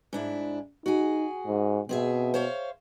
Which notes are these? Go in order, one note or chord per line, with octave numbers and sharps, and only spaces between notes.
G#2 D4 E4
D#4 F#4 G#4
G#2
B2 C4 G#4 E5
C5 C#5 F5